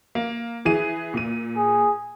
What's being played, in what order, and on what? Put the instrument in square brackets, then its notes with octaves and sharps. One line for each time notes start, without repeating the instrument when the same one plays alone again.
[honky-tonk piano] A#3
E3 G#4 D#7
A#2 D#7
[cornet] G#4